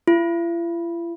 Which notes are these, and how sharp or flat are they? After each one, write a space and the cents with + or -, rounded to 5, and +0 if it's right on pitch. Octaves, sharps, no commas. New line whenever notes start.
E4 +45